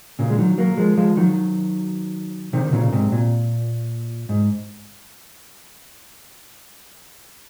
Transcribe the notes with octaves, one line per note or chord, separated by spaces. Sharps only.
A#2 C#3
G#3
D#3 F#3
F#3 A#3
F3 G#3
F3 G#3
D#3 F#3
C3 D#3
D#3
A#2 C#3
G#2 C3
A#2
G#2